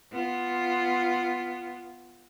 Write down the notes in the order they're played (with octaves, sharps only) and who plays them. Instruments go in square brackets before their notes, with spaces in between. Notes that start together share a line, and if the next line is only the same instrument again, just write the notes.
[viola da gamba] B3 F4